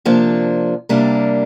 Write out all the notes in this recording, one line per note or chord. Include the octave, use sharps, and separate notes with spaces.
C3 F3 A#3 D4
C3 G3 A#3 D4 A#4